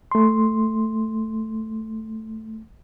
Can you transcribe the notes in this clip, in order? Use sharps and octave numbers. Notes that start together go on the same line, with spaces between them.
A3 C6